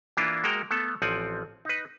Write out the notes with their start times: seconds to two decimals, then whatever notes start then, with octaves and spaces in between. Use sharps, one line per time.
0.17 E3 A#3 D4 E4 F4
0.44 G#3 A#3 F#4 A#4 G5 A#5
0.71 A3 B3 A4
1.02 A1 F3 C4 D5 F#5 G#5
1.65 D#4 B4